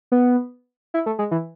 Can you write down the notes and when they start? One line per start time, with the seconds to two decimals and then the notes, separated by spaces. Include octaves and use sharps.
0.12 B3
0.94 E4
1.06 A3
1.19 G#3
1.31 E3